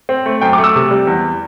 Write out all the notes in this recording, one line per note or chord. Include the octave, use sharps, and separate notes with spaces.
C4
A3
F#2 G5
D6
A3
E6
C3
G3
E2